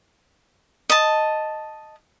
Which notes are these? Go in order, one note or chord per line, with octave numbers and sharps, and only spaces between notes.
D#5 A5